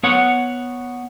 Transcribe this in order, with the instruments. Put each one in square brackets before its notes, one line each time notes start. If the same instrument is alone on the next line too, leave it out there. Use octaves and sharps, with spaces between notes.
[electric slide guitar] B3 C#5 F#5